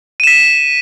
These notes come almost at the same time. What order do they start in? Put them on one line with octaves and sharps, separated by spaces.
D#7 E7 B6